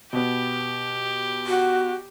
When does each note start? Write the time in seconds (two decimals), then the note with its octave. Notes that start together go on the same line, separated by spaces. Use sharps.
0.13 B2 B3 G4
1.47 F#4